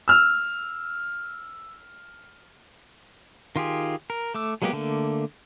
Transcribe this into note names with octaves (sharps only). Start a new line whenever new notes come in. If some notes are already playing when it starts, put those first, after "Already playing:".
E6 F6
D#3 F4 G4 G#4
A#4
A3 D6 E6
F#3 G#3 A#3 B3 G4
D3 A3 A#3